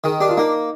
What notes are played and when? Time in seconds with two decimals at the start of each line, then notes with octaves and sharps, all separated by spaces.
0.04 D#3 G#4
0.20 D4 G4
0.29 F4
0.37 A#3 D#4